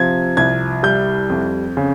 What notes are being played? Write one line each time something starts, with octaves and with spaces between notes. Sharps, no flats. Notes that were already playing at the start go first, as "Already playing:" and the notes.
Already playing: C3 F3 G#6
C2 G#6
G3 G6
F2
C#3